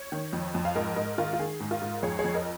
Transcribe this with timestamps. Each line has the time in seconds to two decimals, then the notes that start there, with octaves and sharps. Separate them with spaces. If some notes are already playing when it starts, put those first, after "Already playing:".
Already playing: C#5
0.12 D#3
0.33 F2
0.55 F2
0.65 F5
0.75 G#2 A#4 D#5
0.96 G#2 A#4 D#5
1.18 D#3 F4 A#4
1.33 F4
1.39 D#3 G#4
1.60 G#2
1.71 F4 A#4
1.82 G#2
2.03 F2 G#4 C#5
2.19 G#4 C#5
2.24 F2
2.35 A#4 D#5